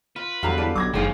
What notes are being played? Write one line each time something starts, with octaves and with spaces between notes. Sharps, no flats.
F4 B4
E2 D3 F#3 G3 F5 A#5
D5 F5 A5 B5
B1 D6 G#6 A#6
F#1 D#2 G#2 F3 G#4 F5